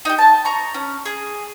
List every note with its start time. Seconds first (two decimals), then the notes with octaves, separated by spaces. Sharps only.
0.05 D#4 G4
0.18 A5
0.45 A#5 C#6
0.74 C#4
1.05 G#4